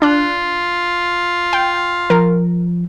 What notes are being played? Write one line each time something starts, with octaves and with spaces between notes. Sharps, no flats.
D4 F4 F#6
G5
F3 A#4